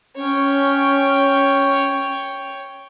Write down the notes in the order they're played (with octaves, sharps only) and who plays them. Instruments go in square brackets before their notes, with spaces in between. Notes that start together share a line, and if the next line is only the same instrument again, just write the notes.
[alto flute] C#4 [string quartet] C#5 G5